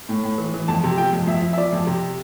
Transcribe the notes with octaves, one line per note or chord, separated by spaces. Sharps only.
A2
A2
E3
E3
F2 A5
C3
F3 G5
F2
F2 E5
F3
E5
F3 D5
F2
C3